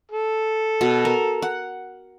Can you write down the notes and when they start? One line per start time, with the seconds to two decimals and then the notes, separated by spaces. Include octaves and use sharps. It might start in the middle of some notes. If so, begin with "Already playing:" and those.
0.11 A4
0.81 B2
1.05 A#4
1.42 F#5